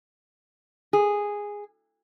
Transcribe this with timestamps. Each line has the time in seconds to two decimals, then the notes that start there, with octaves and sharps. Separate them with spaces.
0.93 G#4